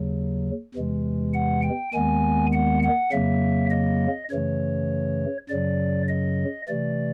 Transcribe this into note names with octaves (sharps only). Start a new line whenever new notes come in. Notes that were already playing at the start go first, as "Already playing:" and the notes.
Already playing: D#2 C#3 F#3
E2 C3 E3 G#3
F#5
G5
D#2 D#3 G#3 B3 G#5
F#5
F#5
F2 C#3 F#3 A#3 E5
D#5
F#2 C#3 E3 A3 C#5
F#2 C#3 F#3 D5
D#5
C3 E3 A3 D5